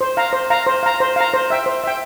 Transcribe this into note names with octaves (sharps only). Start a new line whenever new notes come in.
C5
F5 A#5
C5
F5 A#5
C5
F5 A#5
C5
F5 A#5
C5
E5 G5
C5
E5 G5